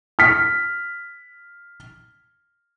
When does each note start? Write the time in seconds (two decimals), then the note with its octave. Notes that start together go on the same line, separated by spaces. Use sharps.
0.19 F6 B6